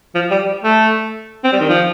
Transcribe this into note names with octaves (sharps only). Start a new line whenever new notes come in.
F3
G3
A3
C4
G3
D#3
F3